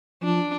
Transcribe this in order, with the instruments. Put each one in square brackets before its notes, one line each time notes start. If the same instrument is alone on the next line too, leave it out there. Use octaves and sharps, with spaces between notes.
[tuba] F3 [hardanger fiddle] D4